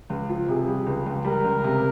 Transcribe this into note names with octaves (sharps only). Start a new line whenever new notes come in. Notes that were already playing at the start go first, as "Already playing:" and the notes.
C#2
F3
C3 G#4
G3
C#2
C#2
G3 A#4
C#2
C3